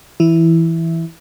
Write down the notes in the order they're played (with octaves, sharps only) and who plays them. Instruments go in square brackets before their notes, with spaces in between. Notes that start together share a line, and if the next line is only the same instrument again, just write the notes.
[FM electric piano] E3 E4